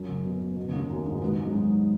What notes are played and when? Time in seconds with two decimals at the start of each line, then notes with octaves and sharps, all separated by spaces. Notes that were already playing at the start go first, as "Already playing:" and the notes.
Already playing: F#2 F#3
0.09 C#3
0.25 B2
0.41 B2
0.57 B2
0.68 C#3
0.73 D#2 D#3
0.89 F#2 F#3
1.06 G#2 G#3
1.18 G#3
1.22 B2 B3
1.37 G#3
1.45 F#3
1.53 G#2 G#3